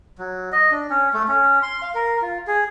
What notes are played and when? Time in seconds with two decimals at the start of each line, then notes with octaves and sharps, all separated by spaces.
0.18 F#3
0.52 D#5
0.72 D4
0.90 C#4
1.14 A3
1.28 C#4
1.62 C6
1.82 F5
1.95 A#4
2.22 F4
2.47 G#4